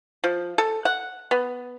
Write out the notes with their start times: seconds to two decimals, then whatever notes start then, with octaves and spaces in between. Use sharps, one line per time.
0.24 F3
0.58 A4
0.85 F#5
1.31 B3